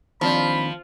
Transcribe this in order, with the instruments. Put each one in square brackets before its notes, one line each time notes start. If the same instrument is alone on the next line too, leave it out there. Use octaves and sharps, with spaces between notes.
[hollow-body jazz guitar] D#2 C4 D4 [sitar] F3 [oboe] B5